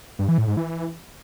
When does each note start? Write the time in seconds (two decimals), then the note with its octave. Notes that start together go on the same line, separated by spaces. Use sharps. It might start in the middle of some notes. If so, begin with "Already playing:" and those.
0.19 G2
0.28 E3
0.38 A2
0.48 G#2
0.57 E3